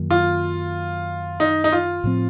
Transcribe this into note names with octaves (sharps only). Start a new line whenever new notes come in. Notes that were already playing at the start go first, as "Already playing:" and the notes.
Already playing: F#2 D#3 F#3 A#3
F4
D#4
D#4
F4
A2 F3 C4